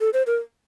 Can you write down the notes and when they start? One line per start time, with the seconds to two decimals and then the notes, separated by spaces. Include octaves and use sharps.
0.01 A4
0.13 C5
0.27 A#4